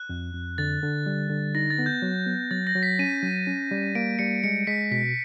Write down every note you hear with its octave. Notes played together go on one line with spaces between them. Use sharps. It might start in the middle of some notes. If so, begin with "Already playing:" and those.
Already playing: F#6
F2
F2
D3 A6
D3
G3
D3
D#4 A#6
A6
B3
G6
F#3
B3
F#3 A6
A#6
F#3
B6
C#4 D#7
F#3
C#4
G3
A#3 D7
G3 C#7
G#3 C#7
G#3 B6
B2 B6